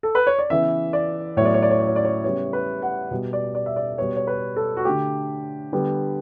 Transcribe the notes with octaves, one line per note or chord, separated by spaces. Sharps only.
A4
B4
C#5
D5
C#3 E3 B3 E5
D5
A2 F#3 B3 C#5
D5
C#5
D5
C#5
D5
C#5
D5
C#5
C#3 G3 B3 C#5
B4
F#5
B2 G3 B3
D5
D5
E5
D5
B2 G3 B3 C#5
C#5
B4
A4
F#4
D3 A3 G4
D3 G3 B3